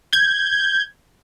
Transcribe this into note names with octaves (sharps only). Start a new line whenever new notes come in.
G6 G#6